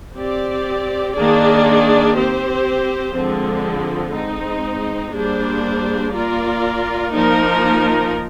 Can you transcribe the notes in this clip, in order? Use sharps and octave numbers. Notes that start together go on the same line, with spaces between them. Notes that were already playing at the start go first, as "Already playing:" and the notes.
C4 G4 D5
D#3 A#3 D4 G#4 D5
C4 G4 C5
D3 F3 G#3 C4
G#3 C4 D#4
G3 A#3 D4 G#4 C5
A#3 F4 A#4 D5
F3 A#3 D#4 A#4